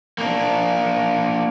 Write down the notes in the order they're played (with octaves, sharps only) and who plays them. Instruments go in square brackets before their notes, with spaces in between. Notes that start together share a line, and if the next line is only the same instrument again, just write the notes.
[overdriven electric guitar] A#3 D4